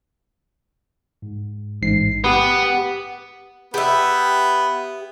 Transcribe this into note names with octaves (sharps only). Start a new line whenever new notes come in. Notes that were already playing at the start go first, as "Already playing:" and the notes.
G#2
A1 G#2 C7
B3 G4 B4
B3 G4 E5